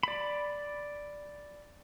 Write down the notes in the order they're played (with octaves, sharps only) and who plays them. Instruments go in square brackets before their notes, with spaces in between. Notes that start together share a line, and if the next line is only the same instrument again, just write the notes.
[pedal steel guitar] D5 B5